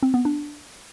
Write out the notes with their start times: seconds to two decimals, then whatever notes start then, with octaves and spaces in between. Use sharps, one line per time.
0.03 C4
0.14 B3
0.25 D4